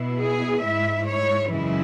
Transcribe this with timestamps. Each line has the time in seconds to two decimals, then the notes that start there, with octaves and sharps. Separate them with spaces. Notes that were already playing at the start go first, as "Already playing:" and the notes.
Already playing: B2 B3 E4
0.20 G#4
0.63 G#2 G#3 E4 E5
1.08 C#5
1.51 F#2 C#3 E3 G#3 E4